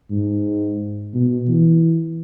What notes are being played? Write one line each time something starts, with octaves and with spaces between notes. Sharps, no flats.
G#2
B2
E3